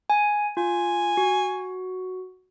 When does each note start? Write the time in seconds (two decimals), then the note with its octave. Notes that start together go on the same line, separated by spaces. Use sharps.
0.10 G#5
0.57 F4 G#5
1.17 F#4